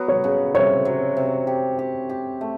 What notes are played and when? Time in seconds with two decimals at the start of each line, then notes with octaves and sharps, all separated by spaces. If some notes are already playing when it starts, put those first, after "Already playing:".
Already playing: F#3 B3
0.08 C#5
0.24 C#3
0.55 C3 C#5
0.85 F#3
1.17 C3
1.47 G4
1.79 G4
2.09 G4
2.41 A3